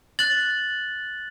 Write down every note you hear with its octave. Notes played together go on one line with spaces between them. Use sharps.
F#6 A6 F#7